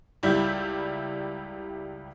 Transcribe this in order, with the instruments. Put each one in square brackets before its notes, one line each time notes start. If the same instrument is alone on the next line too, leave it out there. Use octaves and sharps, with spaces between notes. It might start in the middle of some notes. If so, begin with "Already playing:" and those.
[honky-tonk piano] C#2 G3 E4 G6